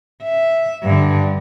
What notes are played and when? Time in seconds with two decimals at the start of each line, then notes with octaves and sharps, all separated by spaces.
0.23 E5
0.83 G2 D3